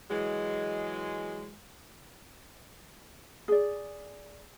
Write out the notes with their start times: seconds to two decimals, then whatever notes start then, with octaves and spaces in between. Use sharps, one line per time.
0.10 E3 F#3 G#3
3.48 G#4 D5